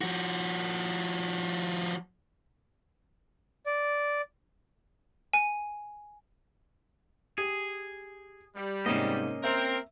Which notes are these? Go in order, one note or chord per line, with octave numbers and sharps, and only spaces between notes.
F3 F#4
D5
G#5
G4 G#4
G3
G#2 C3 A#3 C#4 D#5
C4 A#4 E5